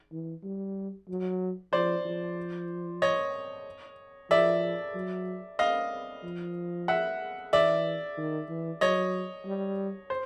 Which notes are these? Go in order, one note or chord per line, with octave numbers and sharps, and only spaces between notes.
E3
G3
F#3
F3 C5 D5
F3
C#5 D#5
F3 D5 E5
F#3
D#5 F5
F3
E5 F#5
E3 D5 E5
D#3
E3
F#3 C#5 D#5
G3
C5